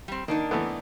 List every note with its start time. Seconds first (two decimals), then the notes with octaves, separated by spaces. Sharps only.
0.08 G3 C4
0.28 D#3 A#3 D4 D#4
0.51 E3 A3 B3